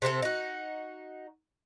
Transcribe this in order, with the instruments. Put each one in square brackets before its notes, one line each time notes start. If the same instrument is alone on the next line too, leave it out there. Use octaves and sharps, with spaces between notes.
[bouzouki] C3 C4 D4 A4
D#4 F#4